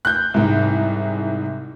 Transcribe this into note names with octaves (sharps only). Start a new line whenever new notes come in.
F#6 G6
C2 G#2